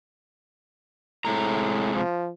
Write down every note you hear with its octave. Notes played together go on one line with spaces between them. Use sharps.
A2 C3 G#3 A#5
F3